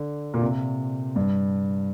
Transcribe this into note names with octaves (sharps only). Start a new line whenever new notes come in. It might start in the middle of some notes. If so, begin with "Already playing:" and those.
Already playing: D3
A#2
C3
G2